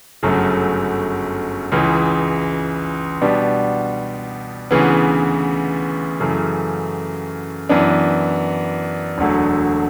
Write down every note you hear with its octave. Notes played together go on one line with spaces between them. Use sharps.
G1 F#2 C#3 F#3 A3
C#2 C#3 E3
B2 G3 B3 D4 G4
D2 C#3 E3 B3
F#2 C#3 E3 A3
F#2 E3 B3 D4
E1 D2 D3 F#3 A3